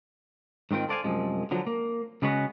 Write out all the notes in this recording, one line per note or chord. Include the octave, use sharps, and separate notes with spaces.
G#2 D#3 C4 F4 G5
A4 C5 D5 F5 F#5 G#5
C2 F#2 F3 G#3
D3 F3 F#3
A#3
C#3 G3 G#3 B3 C#4 F#4